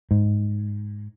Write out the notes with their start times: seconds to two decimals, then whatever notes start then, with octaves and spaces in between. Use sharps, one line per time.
0.11 G#2